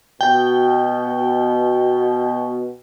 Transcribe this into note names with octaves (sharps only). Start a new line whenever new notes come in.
B2 G5